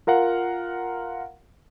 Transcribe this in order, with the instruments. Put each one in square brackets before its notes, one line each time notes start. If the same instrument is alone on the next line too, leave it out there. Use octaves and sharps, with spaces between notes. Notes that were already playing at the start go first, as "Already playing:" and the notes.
[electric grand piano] F4 A#4 F5 F#5